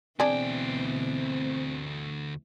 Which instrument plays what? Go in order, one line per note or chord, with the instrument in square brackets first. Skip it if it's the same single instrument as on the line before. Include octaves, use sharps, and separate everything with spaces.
[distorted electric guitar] D2 G5 [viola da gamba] B2 E3 [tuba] C4 [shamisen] D4 G#4